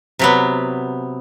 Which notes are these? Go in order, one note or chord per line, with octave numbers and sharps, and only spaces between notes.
C3 F#3 B3